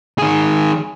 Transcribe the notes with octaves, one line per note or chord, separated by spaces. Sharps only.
D#3 G#4